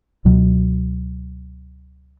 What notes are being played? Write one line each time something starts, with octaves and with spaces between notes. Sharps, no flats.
C#2 B2 F#3